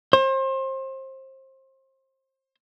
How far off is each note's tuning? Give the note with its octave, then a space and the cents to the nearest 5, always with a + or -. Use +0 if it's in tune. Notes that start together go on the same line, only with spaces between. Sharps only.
C5 +30